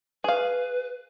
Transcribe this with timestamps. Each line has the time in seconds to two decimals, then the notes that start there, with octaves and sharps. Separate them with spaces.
0.24 G#4 B4 F5